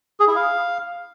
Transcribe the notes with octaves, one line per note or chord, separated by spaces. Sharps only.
G#4
E4
F5